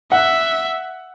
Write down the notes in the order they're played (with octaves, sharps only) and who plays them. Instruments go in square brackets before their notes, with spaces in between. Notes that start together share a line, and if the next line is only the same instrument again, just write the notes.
[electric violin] E5 [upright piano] F#5